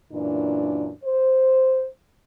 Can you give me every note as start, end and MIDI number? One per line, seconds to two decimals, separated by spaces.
0.12 0.91 42
0.12 0.91 46
0.12 0.91 52
0.12 0.91 62
1.04 1.87 72